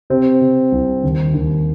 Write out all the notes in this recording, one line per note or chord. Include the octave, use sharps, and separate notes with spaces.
C3 C4
C3
C2
D#2
D#2